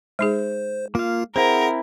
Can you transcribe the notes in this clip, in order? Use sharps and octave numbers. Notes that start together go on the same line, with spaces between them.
G#3 D#4 G#4 C5
A#3 F4 F5
C4 E4 G#4 A#4 C5 F#5